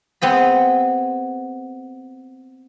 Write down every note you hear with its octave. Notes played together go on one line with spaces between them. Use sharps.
B3 C4 G#4 B5